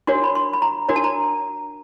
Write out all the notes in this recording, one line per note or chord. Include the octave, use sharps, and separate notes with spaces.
D4 F#4 A#4 C#5 C6
B5
C6
B5
A#5
D4 F#4 A#4 C#5 A#5
A5
A#5